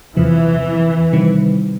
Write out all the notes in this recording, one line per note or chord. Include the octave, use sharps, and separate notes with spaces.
E2 C3 E3 F3
C3 D#3 G3